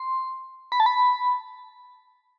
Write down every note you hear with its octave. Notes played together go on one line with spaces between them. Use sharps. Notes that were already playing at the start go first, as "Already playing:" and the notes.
Already playing: C6
B5
A5
B5